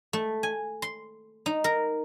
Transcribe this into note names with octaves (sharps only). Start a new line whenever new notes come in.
A3
G#5
C6
D#4
A#4